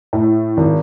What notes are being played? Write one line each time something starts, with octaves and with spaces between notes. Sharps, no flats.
A2
G#1